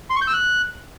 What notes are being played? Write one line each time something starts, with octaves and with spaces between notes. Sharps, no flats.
C6
C#6
G6
E6
F#6